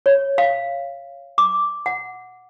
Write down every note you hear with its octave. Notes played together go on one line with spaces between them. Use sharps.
C#5
F5
D6
F#5